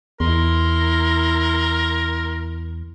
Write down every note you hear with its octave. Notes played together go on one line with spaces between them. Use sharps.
E2 E4 A#4 C6